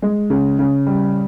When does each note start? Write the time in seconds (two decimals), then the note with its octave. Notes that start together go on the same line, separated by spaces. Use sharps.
0.02 G#3
0.30 C#3
0.59 C#3
0.86 G3